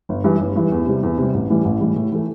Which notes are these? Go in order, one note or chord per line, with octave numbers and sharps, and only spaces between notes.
G1
G2 E3
G1
G2 E3
E2
C3 G3
E2
C3 G3
A1
A2 E3 G3
A1
A2 E3 G3
A2
E3 A3